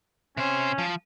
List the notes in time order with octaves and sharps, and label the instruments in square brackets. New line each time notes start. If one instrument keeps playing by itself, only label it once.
[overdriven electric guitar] C3 C5 [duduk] C#4
[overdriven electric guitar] F3